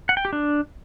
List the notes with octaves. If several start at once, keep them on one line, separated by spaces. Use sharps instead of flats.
F#5
G5
G4
D4